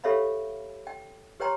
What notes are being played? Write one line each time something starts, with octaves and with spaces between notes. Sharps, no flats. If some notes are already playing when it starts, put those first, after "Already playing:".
G4 A4 C#5 E5 F5 B5
G5
G4 B4 C#5 G5 A#5 C6